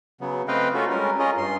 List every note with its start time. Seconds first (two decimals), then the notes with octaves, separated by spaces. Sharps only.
0.21 C#3 F#3 B3
0.48 A3 C4 B4 D#5 F5 G5
0.74 A3 A#3 C#4 F4 F#4 A4
0.90 G3 G#3 C#4 A#4
1.19 C#4 F4 G#4 A#4 C#5 D#5
1.37 G2 C6